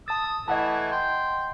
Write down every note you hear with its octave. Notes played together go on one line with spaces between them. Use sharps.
A5 D#6 E6 A6
E3 A3 D#5 F#5 G#5 A5
G5 C6